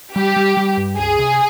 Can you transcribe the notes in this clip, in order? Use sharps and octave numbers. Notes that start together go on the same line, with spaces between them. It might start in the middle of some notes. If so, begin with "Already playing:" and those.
G3 G4
G3
G3
G2
C#2 G#4
C3